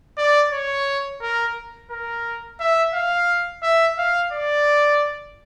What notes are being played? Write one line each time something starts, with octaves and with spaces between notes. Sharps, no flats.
D5
C#5
A#4
A#4
E5
F5
E5
F5
D5